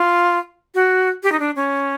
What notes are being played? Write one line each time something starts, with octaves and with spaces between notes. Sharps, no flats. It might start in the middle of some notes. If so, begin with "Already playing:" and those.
Already playing: F4
F#4
G4
D#4
D4
C#4